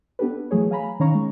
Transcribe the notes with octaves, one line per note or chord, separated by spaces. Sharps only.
B3 D4 G4 A4 B4
E3 F#3 A3 G#4 C#5
F5 G#5 A#5 B5
D#3 C#4 C#5 F5 A#5 C#6
G#3